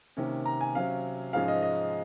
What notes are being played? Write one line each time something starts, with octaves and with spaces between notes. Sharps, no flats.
C3 D#3 A#3 C#4
A#5
G#5
C3 F#3 C#4 F5
G#2 F3 G#3 C#4 F5
D#5
D#5